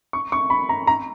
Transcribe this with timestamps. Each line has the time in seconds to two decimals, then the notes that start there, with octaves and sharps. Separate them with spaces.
0.13 C#6
0.32 C#6
0.50 B5
0.69 A#5
0.87 A#5